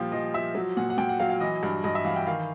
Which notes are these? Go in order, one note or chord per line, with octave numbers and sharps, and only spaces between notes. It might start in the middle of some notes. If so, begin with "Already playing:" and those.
Already playing: A#2 F3 G3 F5 G5
F3 D#5
F3 E5
F#3
A#2 F#5
F#5
A#2 G5
F#5
F#3 F5
F5
E3 D#5
G2
G2 D#5
E5
E3 F5
G5
D#3 F5